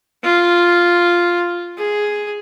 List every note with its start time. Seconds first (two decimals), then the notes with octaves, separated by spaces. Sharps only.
0.24 F4
1.78 G#4